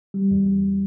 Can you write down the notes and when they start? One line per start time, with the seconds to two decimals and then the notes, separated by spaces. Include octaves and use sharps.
0.14 G3
0.31 E2
0.47 E2